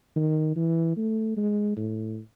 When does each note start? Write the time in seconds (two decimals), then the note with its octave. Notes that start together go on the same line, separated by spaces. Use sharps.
0.16 D#3
0.56 E3
0.97 A3
1.37 G#3
1.77 A2